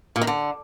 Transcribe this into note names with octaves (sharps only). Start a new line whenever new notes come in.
A#2
D#3
D3